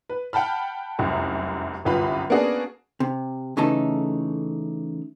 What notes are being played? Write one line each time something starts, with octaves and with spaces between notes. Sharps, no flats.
B4
F#5 G5 A5 B5 F6
F1 C2 F#2
G1 C2 F#2 F4 B4 B5
A#3 B3 C#4 D4 F#4 G#4
C3
C#3 E3 A3 D#4 A4